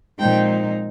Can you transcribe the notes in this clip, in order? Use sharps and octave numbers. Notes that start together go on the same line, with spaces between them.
A#2 F3 G#3 C4 D#4 G5